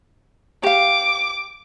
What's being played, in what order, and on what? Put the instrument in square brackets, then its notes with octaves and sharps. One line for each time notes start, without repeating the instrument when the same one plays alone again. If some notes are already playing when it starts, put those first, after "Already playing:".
[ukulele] G4 F5 [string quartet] D6